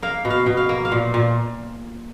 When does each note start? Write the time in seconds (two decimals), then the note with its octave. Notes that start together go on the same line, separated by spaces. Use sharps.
0.02 A#3 F5
0.25 B2
0.30 F5
0.46 B2
0.57 F5
0.69 A#3
0.85 F5
0.92 A#2
1.14 A#2